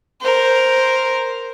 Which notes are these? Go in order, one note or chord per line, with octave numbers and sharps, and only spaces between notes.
A#4 C5